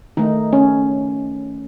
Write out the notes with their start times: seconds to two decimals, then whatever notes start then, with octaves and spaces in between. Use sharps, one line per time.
0.17 D#3 A3 D#4
0.53 C#4